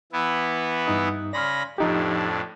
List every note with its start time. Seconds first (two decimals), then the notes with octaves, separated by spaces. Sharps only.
0.12 E3 B3 E4
0.86 G2 D#4 D#6
1.33 C#3 D5 B5 C6 F6 A#6
1.78 F2 A2 F3 D4 D#4 G4